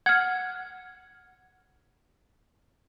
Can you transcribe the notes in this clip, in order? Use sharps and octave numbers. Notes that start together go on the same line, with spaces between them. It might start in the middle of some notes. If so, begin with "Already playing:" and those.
F#5 F6 G#6